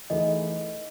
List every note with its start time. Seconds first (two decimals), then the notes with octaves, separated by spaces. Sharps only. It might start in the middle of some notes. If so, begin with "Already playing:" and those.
0.10 E3 A3 D#4 G#4 D#5